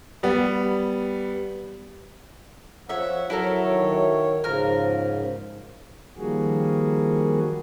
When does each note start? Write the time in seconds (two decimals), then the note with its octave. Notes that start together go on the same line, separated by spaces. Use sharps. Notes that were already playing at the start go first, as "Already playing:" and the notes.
0.23 G3 B3
2.89 F3 C#5 E5 F#5
3.30 F#3 E4 A4 A#4
3.62 D#3 C#5
4.44 G#2 C#3 F3 A#4 F6
6.17 D#3 F3 G3 A#3 F#4 G#4